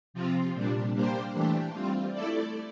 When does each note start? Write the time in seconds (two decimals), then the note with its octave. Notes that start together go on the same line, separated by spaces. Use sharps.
0.14 C3 F3 C4 F4
0.54 A#2 G3 D4
0.94 G3 A#3 D4 G4 C5
1.34 E3 A3 D4 G4
1.72 G3 C4 F4
2.13 A3 E4 A4 D5